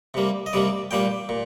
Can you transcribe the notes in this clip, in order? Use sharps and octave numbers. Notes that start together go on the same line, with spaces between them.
C3 G3 A#3
D#5
C3 G3 A#3 D5
A#2 G3 A#3 G5
A#2